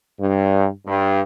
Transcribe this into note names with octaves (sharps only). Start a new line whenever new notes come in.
G2
G2